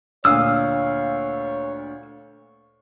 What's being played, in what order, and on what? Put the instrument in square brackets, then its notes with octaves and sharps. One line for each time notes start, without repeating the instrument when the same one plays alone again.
[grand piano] D2 A#2 [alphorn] C#5 [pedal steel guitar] F5 D#6 E6